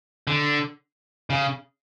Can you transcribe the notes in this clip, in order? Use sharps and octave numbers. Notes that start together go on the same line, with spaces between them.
D3
C#3